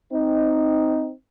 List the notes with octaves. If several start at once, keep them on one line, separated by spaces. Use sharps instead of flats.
C4 D#4